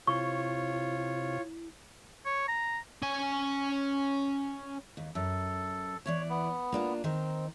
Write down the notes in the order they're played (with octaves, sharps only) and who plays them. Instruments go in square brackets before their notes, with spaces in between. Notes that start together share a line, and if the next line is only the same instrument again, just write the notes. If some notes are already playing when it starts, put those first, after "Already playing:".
[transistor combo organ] C3 [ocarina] E4 [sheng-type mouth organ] F4 C#5 [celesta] C#6
[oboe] C#5
A#5
[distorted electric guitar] C#4 G#5
[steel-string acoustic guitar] D#2
[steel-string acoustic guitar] F#2 [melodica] A4
[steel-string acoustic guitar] E2 E3 D5 [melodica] C#5
[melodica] B3
[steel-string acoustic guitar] A#3 D4 F4
[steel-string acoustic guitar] D#3 D#4 C5 [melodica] C4